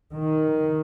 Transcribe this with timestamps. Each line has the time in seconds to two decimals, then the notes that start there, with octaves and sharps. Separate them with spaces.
0.15 D#3